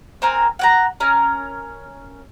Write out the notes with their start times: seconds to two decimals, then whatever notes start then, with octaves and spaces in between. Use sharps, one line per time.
0.22 C4 A#4 G#5
0.59 F#5 G5 A#5
1.00 C#4 A#4